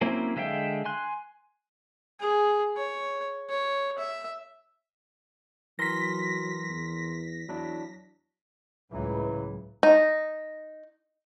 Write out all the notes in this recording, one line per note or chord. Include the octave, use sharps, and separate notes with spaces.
F#3 A#3 C4 C#4 E4
D3 G#3 E5 F5 G5
G#5 C6 F#6
G#4
C#5
C#5
E5
E3 F#3 A#4 C6 A#6 B6
E2
E2 F#3 D4 E4
C#2 A2 C#3 E3 F#3
D#4